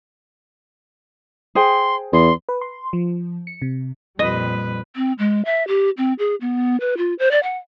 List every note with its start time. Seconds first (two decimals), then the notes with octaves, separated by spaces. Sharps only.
1.55 G#4 C5 G5 C6
2.13 E2 C6
2.49 B4
2.61 C6
2.93 F3
3.47 C#7
3.62 C3
4.19 F2 A#2 G3 B4 D#5
4.96 C4
5.19 G#3
5.45 E5
5.68 G4
5.98 C4
6.19 G#4
6.41 B3
6.80 B4
6.97 F4
7.19 C5
7.31 D5
7.43 F#5